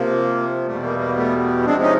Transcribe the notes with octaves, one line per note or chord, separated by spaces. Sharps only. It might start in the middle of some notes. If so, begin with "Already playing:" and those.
Already playing: C3 F3 A#3
E2 B2 G3 A3
A#3
A#3
A3 B3
C3 F3 G#3 C4 D4
C#4 D#4